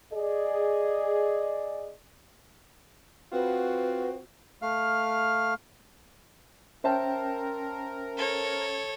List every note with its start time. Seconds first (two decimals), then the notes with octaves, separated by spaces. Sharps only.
0.12 G#4 D5 D#5
3.32 C4 F4 F#4 B4
4.62 A3 F5 F6
6.84 C#4 A#4 C5 E5 G5 A5
8.17 A4 C#5